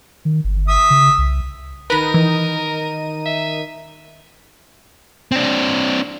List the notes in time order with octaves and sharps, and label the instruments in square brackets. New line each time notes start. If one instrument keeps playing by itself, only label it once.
[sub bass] D#3
G1
[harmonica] E5 D#6
[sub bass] C#3
C2
[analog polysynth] D#3 D#4 D#7 [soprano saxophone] A#4 [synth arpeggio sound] B4 B5
[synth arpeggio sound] E3
[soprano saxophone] E5
[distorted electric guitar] C4 D4